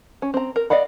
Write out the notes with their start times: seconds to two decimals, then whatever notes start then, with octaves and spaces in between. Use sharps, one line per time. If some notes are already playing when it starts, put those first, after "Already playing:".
0.22 C#4
0.34 C4 A#5
0.56 A#4
0.70 D5 D#5 F5 F#5 B5